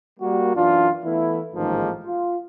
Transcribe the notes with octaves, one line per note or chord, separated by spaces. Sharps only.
G3 A#3 F#4
F#2 E3 D4 F4
E3 A3 B3 E4
A1 G#2 D#3 F3 G#3 A#3
F4